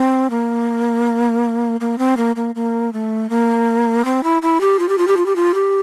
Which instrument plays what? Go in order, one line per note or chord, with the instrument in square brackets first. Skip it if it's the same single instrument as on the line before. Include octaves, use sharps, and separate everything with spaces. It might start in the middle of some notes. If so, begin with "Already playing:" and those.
Already playing: [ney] C4
A#3
A#3
C4
A#3
A#3
A#3
A3
A#3
C4
E4
E4
G4
F4
G4
F4
G4
F4
G4
F4
G4